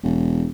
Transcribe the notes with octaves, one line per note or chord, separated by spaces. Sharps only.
E1